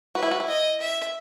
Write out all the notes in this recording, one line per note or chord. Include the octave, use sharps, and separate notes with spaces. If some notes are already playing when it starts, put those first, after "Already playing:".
F#4 B4
E4
F#4
E4
D#5
E5